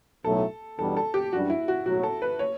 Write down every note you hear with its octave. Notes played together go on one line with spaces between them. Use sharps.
B1 A2 F#3 A3 A4
E2 B2 G3 D4 A4
A4
G4
F#2 E3 G3 D4 F#4
E4
F#4
B1 A2 F#3 F#4
A4
B4
C#5